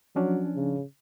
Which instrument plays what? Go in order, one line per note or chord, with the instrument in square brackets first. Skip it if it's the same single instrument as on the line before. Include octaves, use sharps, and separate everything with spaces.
[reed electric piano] F3 C#4 D4 [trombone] F#3
[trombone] C#3